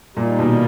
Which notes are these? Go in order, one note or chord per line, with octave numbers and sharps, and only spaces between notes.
A#2 D#3 G3 A#3 D#4
B2